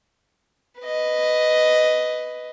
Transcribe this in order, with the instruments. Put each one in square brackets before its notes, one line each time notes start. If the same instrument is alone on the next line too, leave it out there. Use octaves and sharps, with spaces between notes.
[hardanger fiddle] B4 D#5